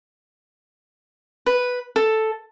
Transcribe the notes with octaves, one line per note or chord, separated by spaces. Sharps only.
B4
A4